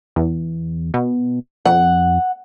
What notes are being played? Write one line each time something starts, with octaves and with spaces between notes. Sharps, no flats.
E2
B2
F2 F#5